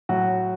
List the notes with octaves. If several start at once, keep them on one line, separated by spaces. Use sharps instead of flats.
A2 F#3 F#4